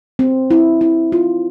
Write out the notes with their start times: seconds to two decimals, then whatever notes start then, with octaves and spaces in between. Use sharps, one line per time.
0.19 C4
0.51 E4
0.81 E4
1.12 F4